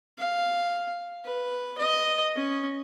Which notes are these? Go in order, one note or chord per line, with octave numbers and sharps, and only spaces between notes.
F5
B4
D#5
C#4